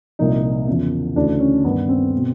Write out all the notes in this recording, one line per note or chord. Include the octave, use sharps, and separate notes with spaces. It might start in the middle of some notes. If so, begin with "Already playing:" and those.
C2 A#2 F3 D#4
E2 C#3 F3
D2 C#3 E3 D4
C#4
G2 D#3 B3
C4
B2